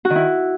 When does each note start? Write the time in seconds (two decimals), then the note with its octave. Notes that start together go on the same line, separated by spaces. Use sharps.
0.05 F#4
0.10 D#3
0.15 E4